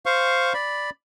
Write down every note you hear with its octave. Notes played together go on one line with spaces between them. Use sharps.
C5 F5 C#6
D5 B5